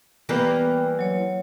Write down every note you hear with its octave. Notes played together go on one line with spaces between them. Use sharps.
E3 G3 A#3 B3 G5
F#3 C#5